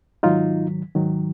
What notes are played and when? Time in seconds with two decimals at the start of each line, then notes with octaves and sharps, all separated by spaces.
0.23 G#2 D#3 F#3 D#4 F4
0.95 G#2 D#3 F#3